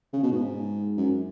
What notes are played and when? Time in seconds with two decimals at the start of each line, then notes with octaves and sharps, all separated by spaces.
0.13 C#3
0.23 B2
0.32 G#2
0.98 F#2